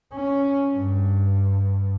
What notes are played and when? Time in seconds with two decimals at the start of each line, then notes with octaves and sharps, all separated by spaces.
0.14 C#4
0.74 G2